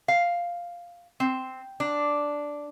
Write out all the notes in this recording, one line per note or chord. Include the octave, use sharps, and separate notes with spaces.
F5
C4
D4